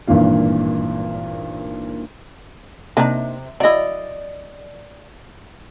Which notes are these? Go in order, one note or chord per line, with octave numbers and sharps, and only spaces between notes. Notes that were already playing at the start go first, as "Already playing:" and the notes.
G#1 G2 A#2 E3 F5
C3 A#3 D4 D#4
F#3 E4 D5 D#5